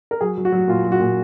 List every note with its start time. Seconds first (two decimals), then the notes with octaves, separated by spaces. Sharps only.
0.11 A#4
0.21 F#3 G#4
0.38 F#3
0.45 F#4
0.52 F#3
0.68 A#2 F4
0.84 F#3
0.92 F#4
1.00 A#2